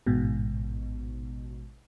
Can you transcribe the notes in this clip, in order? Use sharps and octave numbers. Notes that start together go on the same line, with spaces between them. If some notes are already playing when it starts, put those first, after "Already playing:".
A1 G#2 B2